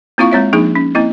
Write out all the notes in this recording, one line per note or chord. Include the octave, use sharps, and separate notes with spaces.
A#3 C4 E4 F4 F5 C#6
G#3 C4 C#5 E5
F3 A#3 D4 D#4 G#4
C#4
A#3 C4 E4 D#5